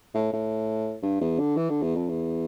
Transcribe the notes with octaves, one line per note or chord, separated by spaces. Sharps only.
A2
A2
G2
E2
D3
E3
D3
E2
F2
E2